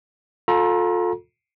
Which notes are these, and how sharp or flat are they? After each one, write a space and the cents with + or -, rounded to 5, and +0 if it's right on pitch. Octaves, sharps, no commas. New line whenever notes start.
F4 +35 A4 +0 A#5 +35